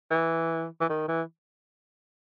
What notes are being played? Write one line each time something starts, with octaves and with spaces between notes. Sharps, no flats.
E3
E3
D#3
E3